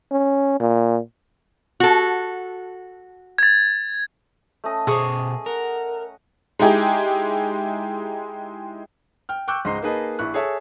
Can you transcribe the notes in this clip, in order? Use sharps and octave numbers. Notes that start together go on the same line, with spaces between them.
C#4
A#2
F#4 A4
G#6 A6
A3 C#4 D#5
B2 G#4 C5 C#6 D#6
A#4 F#5
G#3 D#4 E4 G4 G#4
G5 F6
G5 C#6 D6 E6 F#6 G6
C#2 G#2 D#5 A#5 C6 C7
A#3 D#4 G#4 B4 D#5 A5
A#1 E4 C#6 F#6
G#4 A4 C#5 E5 G#5 A5